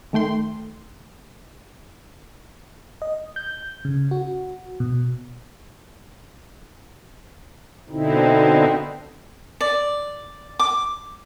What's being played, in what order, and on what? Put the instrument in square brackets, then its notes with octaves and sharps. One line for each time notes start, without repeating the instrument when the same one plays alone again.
[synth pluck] D#3 A3 G5 C6
[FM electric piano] D#5
G6
C#3
F#4
B2
[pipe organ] B2 D3 C4 D#4 E4
[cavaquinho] D5
D6